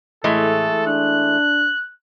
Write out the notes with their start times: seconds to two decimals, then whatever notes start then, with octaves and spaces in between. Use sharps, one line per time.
0.24 A2 E3 G#3 A3 A4
0.87 D4 F#6